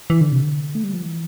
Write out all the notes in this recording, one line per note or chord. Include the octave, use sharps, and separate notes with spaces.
E3
D3
C3
D3
A3
G3
F3
E3